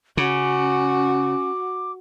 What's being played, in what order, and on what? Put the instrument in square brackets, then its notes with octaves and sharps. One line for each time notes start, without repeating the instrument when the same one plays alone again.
[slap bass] C#3 [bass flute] C#4 [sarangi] F#4 [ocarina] D6